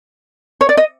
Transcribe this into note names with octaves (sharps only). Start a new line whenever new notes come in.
C#5
D5
D#5